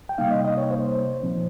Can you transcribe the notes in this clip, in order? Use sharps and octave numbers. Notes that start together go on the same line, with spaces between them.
G5
C3 G3 A#3 D#4 F5
D#5
D#5
C#5
C5
A#2 F3 C4